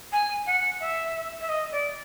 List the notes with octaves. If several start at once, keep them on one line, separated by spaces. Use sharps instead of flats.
G#5
F#5
E5
E5
D#5
D5